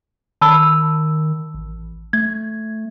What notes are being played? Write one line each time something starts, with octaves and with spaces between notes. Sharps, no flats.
D#3 A5 B5 E6
A1
A3 G#6